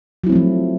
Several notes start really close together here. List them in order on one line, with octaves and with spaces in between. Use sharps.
F#3 E4 C4 A3 F3